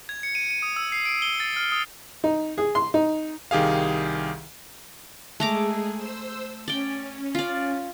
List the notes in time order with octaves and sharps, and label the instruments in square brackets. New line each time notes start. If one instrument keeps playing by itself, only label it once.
[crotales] G#6
C#7
D#7
D#7
D#6
E6
C7
D7
G7
A6
F6
D#6
[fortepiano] D#4
G#4
C6
D#4
[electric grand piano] C2 D#3 G4 G#4 F5
[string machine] G#3 G#4 [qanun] A3 A#5 D6
[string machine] C5 E6
[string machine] C#4 [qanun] D5 G5
[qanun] F4 D5